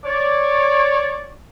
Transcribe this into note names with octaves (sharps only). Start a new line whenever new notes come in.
C#5 D5